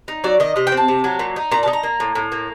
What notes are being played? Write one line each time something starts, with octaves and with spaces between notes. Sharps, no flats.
D#4
F#3 D5
D#3 D#5
C3 D#5
G5
C4
A5
C3
F#3
A#2
D#4
A#2 A#5
A5
D#4
A#5
A#3
A2
A2
A#3